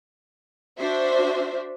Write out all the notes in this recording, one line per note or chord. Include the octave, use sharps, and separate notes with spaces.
D4 F#4 C5 E5